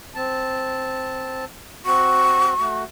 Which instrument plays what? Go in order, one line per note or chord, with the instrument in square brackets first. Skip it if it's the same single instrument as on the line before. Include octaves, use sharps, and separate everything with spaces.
[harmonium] C4 A5
[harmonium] C4 F#4 [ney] C#6
[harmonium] A3 F#4